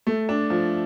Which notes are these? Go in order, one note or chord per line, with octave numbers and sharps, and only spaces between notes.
A3
D4
F3